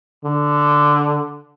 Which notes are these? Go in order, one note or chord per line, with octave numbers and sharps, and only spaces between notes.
D3